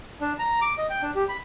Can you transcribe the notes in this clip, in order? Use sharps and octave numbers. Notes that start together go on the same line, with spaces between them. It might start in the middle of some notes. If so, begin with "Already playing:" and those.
D4
A#5
D6
D#5
G5
D4
G4
B5